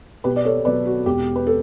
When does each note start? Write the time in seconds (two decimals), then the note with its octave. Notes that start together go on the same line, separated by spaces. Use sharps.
0.24 B1 G4 B4
0.36 D5
0.45 A4 C#5
0.65 B2 F#3 B4 D5
0.86 F#4
1.06 E1 G4
1.36 B4
1.47 A4